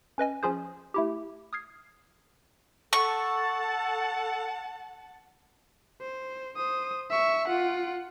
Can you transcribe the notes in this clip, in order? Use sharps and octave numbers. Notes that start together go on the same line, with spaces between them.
C#4 B4 D#5 G#5
F3 C#4 F4 G#4 C5
A3 E4 G4
D#6 F6 G#6 C7
A4 F#5 A5 C#6
C5
C5 D#6
E5 C#6
F4 F#5